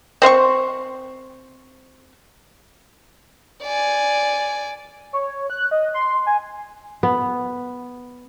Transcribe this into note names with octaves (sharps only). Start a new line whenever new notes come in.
C4 C5 F5 C#6
D5 G#5
C#5
F#6
D#5
C6
G#5
B3